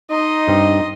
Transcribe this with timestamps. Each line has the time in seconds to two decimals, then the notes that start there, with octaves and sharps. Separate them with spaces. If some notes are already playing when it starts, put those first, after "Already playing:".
0.11 D#4 D#5 C6
0.48 G2 C4